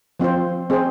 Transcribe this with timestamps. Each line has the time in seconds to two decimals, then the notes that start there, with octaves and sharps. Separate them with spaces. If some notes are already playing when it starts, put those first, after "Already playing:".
0.20 F3 C4 F4 C5
0.70 C4 G#4 C5